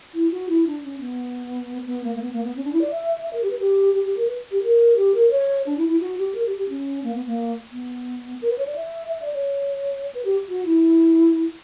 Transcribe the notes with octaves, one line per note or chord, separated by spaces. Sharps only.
E4
F#4
E4
D4
C#4
B3
B3
A#3
A#3
B3
A#3
B3
C#4
D4
E4
D5
E5
E5
A#4
G4
B4
G4
G4
G4
A#4
B4
G4
A#4
G4
A#4
C#5
D4
E4
E4
F#4
G4
A#4
G4
G4
C#4
A#3
B3
A#3
B3
A#4
B4
C#5
D5
E5
E5
D5
C#5
B4
G4
F#4
E4